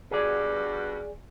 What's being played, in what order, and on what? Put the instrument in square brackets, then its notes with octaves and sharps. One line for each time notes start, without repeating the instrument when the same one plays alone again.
[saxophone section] G2 B2 F#4 [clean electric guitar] G#4 D5